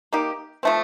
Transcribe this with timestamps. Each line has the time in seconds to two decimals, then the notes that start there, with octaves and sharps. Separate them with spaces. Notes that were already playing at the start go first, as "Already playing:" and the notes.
0.13 A#3 D#4 G4
0.63 F3 A3 C4